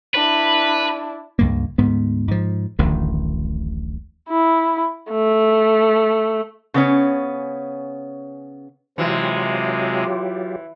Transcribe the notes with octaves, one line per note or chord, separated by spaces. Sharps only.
D4 E4 B4
C#2 G2 A#3
D2 G#2 B3
G#2 F3
D1 A1 D2 D#3
E4
A3
C#3 B3 C#4
C3 E3 F#3 G#3 C4 F4 G4